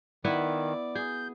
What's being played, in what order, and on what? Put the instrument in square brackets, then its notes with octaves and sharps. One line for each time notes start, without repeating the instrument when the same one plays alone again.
[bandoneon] D#3 [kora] B3 E4 B4 [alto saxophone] D5
[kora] G#4 [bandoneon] G6